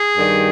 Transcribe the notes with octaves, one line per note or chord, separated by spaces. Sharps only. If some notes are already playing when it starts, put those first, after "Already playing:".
Already playing: G#4
G2 D#3 G3